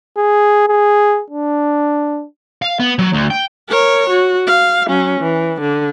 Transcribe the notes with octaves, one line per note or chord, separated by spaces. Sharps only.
G#4
G#4
D4
F5
B3
F#3
D2
G5
A#4 C#5
F#4
F5
F#3 C#4
E3
D3